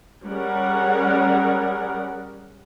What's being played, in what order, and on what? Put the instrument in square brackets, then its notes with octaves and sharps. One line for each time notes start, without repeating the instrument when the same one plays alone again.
[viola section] G3 C#4 G#4 A#4 F#5